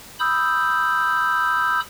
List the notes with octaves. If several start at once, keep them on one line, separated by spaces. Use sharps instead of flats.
B5 D#6 E6 G6